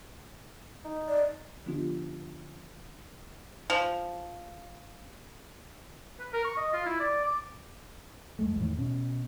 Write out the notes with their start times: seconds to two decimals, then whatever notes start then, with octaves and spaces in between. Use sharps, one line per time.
0.85 D#4
1.08 D5
1.66 D3 F3 B3 D4 F4 G4
3.70 F3
6.19 B4
6.33 A#4
6.45 C#6
6.57 D#5
6.73 F4
6.86 E4
7.00 D5
7.24 D6
8.39 F2 G#3 A3
8.57 E2 A2 D#3
8.77 B2 C#4